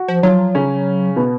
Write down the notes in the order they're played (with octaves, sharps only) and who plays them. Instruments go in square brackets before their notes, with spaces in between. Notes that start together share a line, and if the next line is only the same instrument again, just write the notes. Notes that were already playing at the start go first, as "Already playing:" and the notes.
Already playing: [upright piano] F#4
[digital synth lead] F3
[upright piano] F3 F4 [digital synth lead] F#3
[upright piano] C#3 C#4
B2 B3